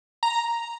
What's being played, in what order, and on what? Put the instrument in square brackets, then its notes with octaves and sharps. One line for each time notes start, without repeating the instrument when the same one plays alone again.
[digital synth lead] A#5